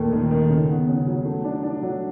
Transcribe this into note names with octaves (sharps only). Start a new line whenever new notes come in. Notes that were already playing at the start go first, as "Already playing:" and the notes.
Already playing: D#2 A#2 A3
D#3
D#3
C#3
B3
C#3
F#3
A3
D4
D4
F#3